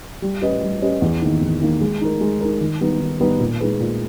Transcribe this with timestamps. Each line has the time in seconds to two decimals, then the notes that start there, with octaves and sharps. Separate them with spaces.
0.22 G3
0.42 C#4 G4 B4 D#5
0.62 G3
0.82 C#4 G4 B4 D#5
1.02 E2
1.21 D#3 A#3 D#4
1.41 E2
1.61 D#3 A#3 D#4
1.81 G#3
2.01 D#4 A#4
2.21 G#3
2.41 D#4 A#4
2.61 D#3
2.81 G3 B3 D#4
3.00 D#3
3.20 G3 B3 D#4
3.40 A#2
3.60 G#3 D#4 G#4 B4
3.80 A#2